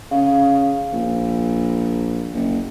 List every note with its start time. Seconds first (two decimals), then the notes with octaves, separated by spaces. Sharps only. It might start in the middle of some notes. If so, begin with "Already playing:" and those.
0.11 C#3 F5
0.92 A#1
2.34 F#1